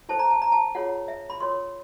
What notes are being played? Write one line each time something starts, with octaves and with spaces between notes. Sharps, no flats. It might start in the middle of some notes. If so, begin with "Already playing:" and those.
E4 A4 C5 A5
A#5
A5
A#5
A5
F4 G#4 C#5 F#5
E5
B5
F4 A#4 C#5 C6